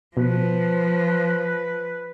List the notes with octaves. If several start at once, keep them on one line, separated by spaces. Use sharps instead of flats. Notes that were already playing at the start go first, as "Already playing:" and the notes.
B2 F3 B4